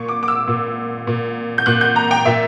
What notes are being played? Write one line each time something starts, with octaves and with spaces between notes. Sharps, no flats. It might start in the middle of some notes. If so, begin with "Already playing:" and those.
Already playing: A#2 C#6
D6
D6
E6
A#2
A#2
G6
A#2 F#6
G6
A#5
G5
A#2 E5